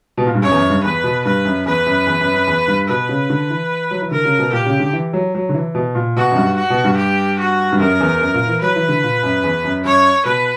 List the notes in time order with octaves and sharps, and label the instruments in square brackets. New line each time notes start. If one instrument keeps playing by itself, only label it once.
[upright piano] B2
A#2
G2
[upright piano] F#2 [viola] C#5
[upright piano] E2
F#2
G2
[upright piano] E2 [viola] B4
[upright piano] B2
[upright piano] G2 [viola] B4
[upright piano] F#2
[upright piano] E2 [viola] B4
[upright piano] F#2
E2
F#2
F#2
E2
G2
[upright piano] B2 [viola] B4
[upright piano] C#3
D3
E3
F#3
E3
[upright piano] D3 [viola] A#4
[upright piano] C#3
B2
[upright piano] A#2 [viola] G4
[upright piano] C#3
D3
E3
F#3
F#3
D3
E3
B2
A#2
[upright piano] B2 [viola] F#4
[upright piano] F#2
G2
[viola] F#4
[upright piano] B2
G2
[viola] G4
F#4
[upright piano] G2
[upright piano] F#2 [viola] A#4
[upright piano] E2
F#2
A#2
E3
[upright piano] F#3 [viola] B4
[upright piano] E3
D3
A#2
F#2
E2
F#2
[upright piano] F#2 [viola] C#5
[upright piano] B2 [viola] B4